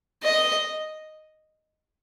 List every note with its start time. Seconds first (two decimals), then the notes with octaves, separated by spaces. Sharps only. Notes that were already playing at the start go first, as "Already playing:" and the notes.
0.23 D#5